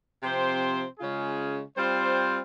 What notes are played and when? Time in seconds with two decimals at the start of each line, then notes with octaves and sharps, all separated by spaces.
0.22 C3 F3 C4 G4 C5
0.99 C#3 G#3 C#4 F4 G#4
1.76 G3 C4 F4 C5